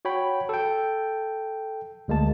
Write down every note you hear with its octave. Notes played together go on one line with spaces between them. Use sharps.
F#4 C#5 G5 B5
A4 G5
D2 G#3 A#3 A5